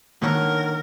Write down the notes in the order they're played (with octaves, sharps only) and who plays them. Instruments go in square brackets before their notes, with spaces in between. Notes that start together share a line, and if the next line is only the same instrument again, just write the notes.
[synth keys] D3 D#3 [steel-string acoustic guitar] A#3 C#5 F#5 [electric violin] A#4